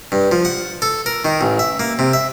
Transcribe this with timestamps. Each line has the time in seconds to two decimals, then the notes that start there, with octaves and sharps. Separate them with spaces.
0.12 G2
0.32 F3
0.45 F#5
0.82 A4
1.06 A#4
1.25 D#3
1.41 A1
1.59 E5
1.80 A#3
1.99 C3
2.13 E5